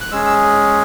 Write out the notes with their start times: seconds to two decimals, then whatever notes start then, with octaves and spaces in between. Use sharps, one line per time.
0.01 F#6
0.12 G#3 C#4 G#4 E6
0.26 E6